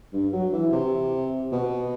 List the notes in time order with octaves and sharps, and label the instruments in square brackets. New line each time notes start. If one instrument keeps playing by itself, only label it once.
[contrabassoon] G2
F#3
E3
C3
B2